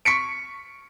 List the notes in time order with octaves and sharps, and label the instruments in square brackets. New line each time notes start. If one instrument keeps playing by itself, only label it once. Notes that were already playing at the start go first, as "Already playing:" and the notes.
[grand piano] C#6 B6 C#7 D7